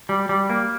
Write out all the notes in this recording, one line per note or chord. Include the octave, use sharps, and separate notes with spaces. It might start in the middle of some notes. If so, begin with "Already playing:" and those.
G3
G3
A#3